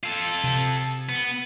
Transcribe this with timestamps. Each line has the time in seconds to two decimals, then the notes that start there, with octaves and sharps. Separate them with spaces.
0.04 F4 A4
0.44 C3
1.09 B3